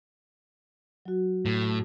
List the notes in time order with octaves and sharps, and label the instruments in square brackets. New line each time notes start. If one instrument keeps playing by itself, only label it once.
[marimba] F#3 F#4
[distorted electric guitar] A2